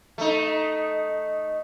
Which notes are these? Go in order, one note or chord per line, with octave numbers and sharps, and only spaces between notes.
A3 D#4